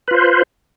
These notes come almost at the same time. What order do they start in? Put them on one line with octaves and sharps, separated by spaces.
B4 F4 C5